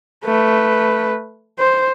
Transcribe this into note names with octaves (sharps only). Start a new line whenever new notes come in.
A3 B4
C5